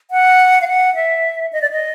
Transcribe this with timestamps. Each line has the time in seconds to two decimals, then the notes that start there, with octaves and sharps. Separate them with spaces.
0.11 F#5
0.61 F5
0.68 F#5
0.95 E5
1.53 D#5
1.62 D5
1.71 D#5